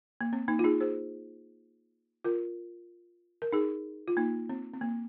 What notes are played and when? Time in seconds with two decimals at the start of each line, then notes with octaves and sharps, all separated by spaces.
0.21 A#3
0.33 C4
0.48 A#3 D#4
0.59 F4
0.64 D#4 G#4
0.80 G#4 C5
2.24 F4 A#4
3.42 A#4
3.53 D#4 G#4
4.08 F4
4.17 A#3 D#4
4.49 C4
4.73 C4
4.81 A#3